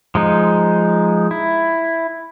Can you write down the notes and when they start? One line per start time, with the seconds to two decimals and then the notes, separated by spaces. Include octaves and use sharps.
0.15 F3 G#3 D#4
1.31 E4